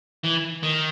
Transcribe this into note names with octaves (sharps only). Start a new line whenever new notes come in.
E3
D#3